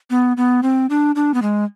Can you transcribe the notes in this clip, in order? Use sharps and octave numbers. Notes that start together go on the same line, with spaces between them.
B3
B3
C4
D4
D4
B3
G#3